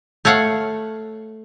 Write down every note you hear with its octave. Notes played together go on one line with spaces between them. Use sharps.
A3 C#5 F5 F#5